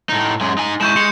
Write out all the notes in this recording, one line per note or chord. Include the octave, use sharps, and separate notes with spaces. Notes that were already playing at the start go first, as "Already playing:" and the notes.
A2 D#4
F#2 G#3
D#4 G#5
G#3 E4 C#6 G6 E7
G#3 C#7